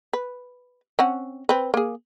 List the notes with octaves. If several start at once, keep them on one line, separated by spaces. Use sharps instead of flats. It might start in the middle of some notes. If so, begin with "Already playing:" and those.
B4
C4 C#4 F#5
C4 B4
A#3 G#4